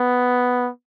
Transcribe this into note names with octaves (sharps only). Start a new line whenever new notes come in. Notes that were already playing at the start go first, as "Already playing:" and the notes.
Already playing: B3